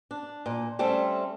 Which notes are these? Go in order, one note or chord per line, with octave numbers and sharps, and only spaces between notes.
D4
A#2
G3 A3 C4 C#4